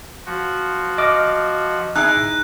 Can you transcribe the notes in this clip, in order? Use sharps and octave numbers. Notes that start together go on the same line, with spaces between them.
F3 F#4
D#5 D6 F6
D#4 E4 G#4 F#6